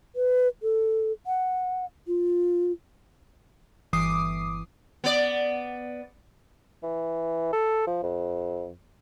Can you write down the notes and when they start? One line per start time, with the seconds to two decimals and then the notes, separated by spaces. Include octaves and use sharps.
0.16 B4
0.63 A4
1.27 F#5
2.07 F4
3.93 G1 E3 D6 D#6 C7
5.04 B3 D5
6.83 E3
7.53 A4
7.87 F3
8.03 F2